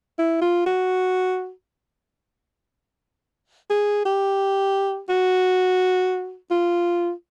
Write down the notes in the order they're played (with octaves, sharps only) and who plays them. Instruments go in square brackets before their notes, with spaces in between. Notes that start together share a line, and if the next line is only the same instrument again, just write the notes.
[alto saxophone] E4
F4
F#4
G#4
G4
F#4
F4